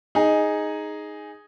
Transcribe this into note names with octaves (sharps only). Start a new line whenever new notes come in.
D#4 G#4